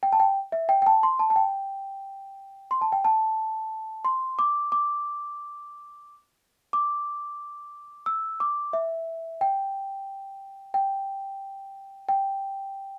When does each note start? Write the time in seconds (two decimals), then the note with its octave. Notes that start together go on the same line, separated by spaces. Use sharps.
0.03 G5
0.12 A5
0.20 G5
0.52 E5
0.69 G5
0.82 G5
0.86 A5
1.03 C6
1.19 A5
1.30 A5
1.36 G5
2.71 C6
2.81 A5
2.92 G5
3.05 A5
4.05 C6
4.39 D6
4.72 D6
6.73 D6
8.06 E6
8.40 D6
8.73 E5
9.41 G5
10.74 G5
12.09 G5